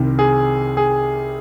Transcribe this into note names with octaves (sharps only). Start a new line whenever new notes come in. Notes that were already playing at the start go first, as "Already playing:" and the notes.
Already playing: C2 C3 D#3
G#4
G#4